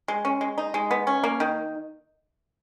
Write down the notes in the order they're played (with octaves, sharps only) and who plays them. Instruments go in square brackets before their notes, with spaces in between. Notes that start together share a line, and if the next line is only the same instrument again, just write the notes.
[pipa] G#3
C#4
G#3
D#4
G#3
B3
C#4
A#3
D#3